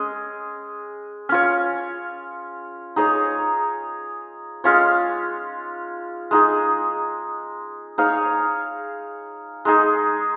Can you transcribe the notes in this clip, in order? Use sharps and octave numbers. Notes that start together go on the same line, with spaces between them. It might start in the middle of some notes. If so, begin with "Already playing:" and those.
Already playing: G#3 C#4 G#4 D#5
C#4 F4 C#5
D#4 G#4 C#5
G#3 C#4 F4 C#5
G#3 D#4 G#4
D#4 G#4 C#5 F5
G#3 D#4 G#4